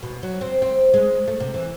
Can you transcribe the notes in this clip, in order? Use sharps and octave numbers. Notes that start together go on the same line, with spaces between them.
B2
F#3
C4
C4
G#3
A3
C3
E3